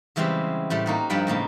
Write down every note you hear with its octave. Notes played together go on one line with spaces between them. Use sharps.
C#3 E3 G3 G#3 B3 C4
A2 G3 A3
A#3 D#4 F#4
G2 F3 G3 F#5 G5 B5
A2 C#3 A#3 B3